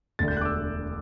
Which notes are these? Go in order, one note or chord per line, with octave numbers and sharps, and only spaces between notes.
E1 D2 D3 A6
G6
F#6
D6
E6